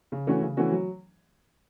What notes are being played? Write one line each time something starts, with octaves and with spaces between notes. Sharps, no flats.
C#3
E3 A3 C#4 F#4
C#3
E3 A3 C#4 F#4
F#3